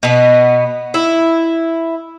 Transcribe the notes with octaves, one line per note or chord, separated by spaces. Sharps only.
B2 B3
E4